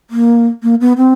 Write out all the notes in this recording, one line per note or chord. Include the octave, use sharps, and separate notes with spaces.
A#3
A#3
B3
C4